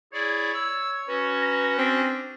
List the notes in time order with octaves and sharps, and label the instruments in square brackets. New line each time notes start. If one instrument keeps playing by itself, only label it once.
[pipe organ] E4 G#4 D5 [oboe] C#5
[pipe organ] E6
[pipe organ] C#4 F#4 [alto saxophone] B4
[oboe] A#5
[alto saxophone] C4 [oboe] D4